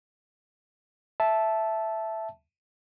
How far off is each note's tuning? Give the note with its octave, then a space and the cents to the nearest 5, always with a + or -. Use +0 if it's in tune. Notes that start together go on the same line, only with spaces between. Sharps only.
E5 +0 A5 -10